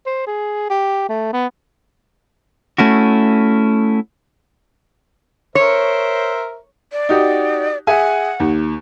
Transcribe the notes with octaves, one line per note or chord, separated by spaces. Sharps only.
C5
G#4
G4
A3
B3
A3 C#4 E4 F#4
A#4 C5 C#5 E5
D5
D#4 F#4 G4
G#4 E5 F#5 G#5
D#2